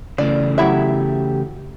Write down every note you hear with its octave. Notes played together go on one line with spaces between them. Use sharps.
C#3 E3 A3 D5
F#3 E4 G4 E5